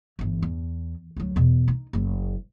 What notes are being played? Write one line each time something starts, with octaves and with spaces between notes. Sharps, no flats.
G1 E3
E2
D2 F#3
E2 B2
D#4
F#1 F#3